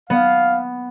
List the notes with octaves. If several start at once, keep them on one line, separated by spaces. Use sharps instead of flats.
B3 F5